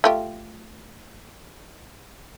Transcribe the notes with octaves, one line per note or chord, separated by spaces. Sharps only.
A3 F4 G4